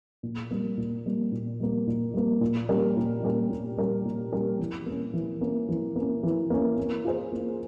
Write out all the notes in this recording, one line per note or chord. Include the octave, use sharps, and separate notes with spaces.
A#2
G3 A#3
A#2
G3 A#3
A#2
G3 A#3
A#2
G3 A#3
A#2
G3 C#4 G4 A#4
A#2
G3 C#4 G4 A#4
A#2
G3 C#4 G4 A#4
A#2
G3 C#4 G4 A#4
E3
A#3 C#4
E3
A#3 C#4
E3
A#3 C#4
E3
A#3 C#4
A#3
F4 G#4 C5
A#3